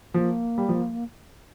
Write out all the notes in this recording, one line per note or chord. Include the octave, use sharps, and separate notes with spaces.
F3 A#3
G3
F3